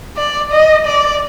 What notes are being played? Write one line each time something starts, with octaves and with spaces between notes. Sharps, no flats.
D5
D#5
D5